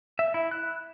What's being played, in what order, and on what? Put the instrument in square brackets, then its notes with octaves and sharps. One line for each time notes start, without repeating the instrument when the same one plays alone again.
[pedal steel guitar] E5
E4
F#6